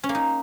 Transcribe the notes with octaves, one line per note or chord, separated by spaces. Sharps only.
C#4
A#3
D#4